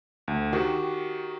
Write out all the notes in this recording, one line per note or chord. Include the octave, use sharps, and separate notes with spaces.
D2
D#3 F#4 G4